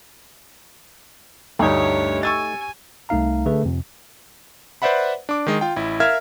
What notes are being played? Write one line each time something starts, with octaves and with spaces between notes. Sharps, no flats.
D2 G2 A3 D#4 G4 C#5
G#5 C#6 E6 A6
C2 A3 D#4 F5 A#5
D3 A3 G#4 B4
F2 C3
B4 C5 D5 E5 F#5 B5
D4 D6
D#3 G#3 D#5
F4 G5
A1 E4
A#4 E5 F5 F6 G#6